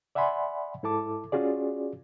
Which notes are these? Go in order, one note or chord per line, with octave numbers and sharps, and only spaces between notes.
D5 E5 F#5 G#5 B5 C6
G#2 E4 A4 A5 D6
C#4 F4 F#4 G#4 D5